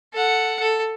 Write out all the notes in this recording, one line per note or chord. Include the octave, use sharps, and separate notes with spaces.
A4 F#5
A4